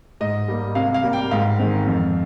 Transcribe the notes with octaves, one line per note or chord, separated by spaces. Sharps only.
G#2 D#5
G3 A#3
C3 F5
F5
G3 A#3
G5
G#2 F5
D#3 G#3 C4
F2